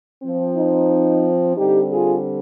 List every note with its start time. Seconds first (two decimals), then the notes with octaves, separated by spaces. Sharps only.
0.23 F3 C4
0.56 D#4
1.57 D3 G3 C4 D#4 G4
1.90 F4 G#4